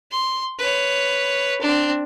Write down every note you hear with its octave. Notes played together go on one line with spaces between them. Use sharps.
C6
B4 C#5
C4 D4